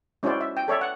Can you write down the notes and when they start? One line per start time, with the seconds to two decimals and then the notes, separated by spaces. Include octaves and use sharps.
0.23 G#3 C#4 E4 F#4 C5 D5
0.41 E5
0.57 G5
0.68 A4 C#5 D5 E5
0.81 F#5